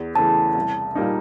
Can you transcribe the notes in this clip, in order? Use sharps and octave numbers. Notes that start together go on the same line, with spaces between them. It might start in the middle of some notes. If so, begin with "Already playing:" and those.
Already playing: E2
C#3 E3 A3 A5
C2
A#2 G3 A#3 D#4